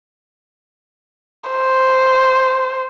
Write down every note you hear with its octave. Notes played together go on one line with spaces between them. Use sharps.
C5